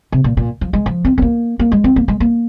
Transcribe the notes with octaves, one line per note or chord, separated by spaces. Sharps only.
C3
A#2
A#2
F3
G#3
F3
C4
C4
A#3
A#3
G#3
C4
A#3
G#3
A#3